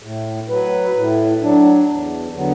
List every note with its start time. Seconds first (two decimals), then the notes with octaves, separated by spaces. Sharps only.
0.03 A2
0.49 F#3 B4
0.96 A2
1.43 F#3 D4
1.89 E2
2.35 D3 F#3 B3